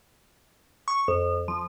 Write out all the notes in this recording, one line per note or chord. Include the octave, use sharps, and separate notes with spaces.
C#6
F2
F3